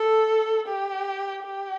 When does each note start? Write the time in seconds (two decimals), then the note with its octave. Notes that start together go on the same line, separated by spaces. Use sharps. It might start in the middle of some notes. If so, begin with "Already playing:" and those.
Already playing: A4
0.68 G4
1.43 G4